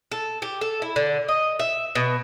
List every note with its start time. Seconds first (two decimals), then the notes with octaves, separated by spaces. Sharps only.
0.12 A4
0.42 G4
0.61 A4
0.82 E4
0.96 D3
1.28 D#5
1.59 E5
1.95 B2